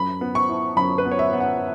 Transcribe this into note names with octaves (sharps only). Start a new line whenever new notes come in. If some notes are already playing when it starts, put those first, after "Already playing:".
Already playing: F#2 B5
B3
C#6
E4
F#2 B5
B4
B3
C#5
E5
B3
F#5